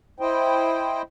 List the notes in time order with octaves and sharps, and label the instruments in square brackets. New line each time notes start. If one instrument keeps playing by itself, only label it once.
[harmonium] E4 C5 D#5 G5